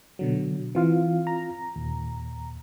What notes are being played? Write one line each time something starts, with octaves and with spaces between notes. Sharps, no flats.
B2 D3 F#3
E3 C4 F4 F5
A#5
D#2 A#2